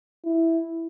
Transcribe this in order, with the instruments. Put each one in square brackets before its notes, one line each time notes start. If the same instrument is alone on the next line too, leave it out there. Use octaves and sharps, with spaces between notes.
[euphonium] E4